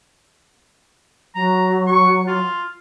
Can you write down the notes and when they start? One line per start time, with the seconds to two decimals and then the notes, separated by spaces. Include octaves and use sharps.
1.35 F#3 A#5
1.87 C#6
2.27 F4